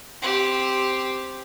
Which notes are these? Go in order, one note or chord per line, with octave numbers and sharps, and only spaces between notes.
C4 G4